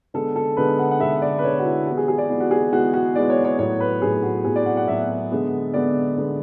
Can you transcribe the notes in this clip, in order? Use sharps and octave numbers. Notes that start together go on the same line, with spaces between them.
D3 G#3 B3 A4
A4
D3 G#3 B3 B4
F#5
F#5
D3 G#3 B3 E5
D5
B4
D3 G#3 B3 C#5
F#4
E4
E3 G#3 B3 F#4
G#4
G#4
D5
E3 G#3 B3
F#4
G#4
E3 G#3 B3 F#4
F#4
E3 G#3 B3 D5
C#5
C#5
A2 F#3 B3 C#5
B4
A2 F#3 B3 G#4
F#4
A2 F#3 B3 G#4
D5
F#5
F#5
A2 F#3 B3 E5
D3 G#3 B3
D3 G#3 B3 D5
D3 G#3 B3